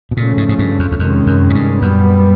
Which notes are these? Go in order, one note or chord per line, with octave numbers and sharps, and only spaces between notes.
B2
A#2 C#3 F3 A3 C#4
G#2
G#2
G2
F2
E2
F2 C3 D#3 G#3 C#4
F#2
G#2
G2
F#2 A#2 G3 B3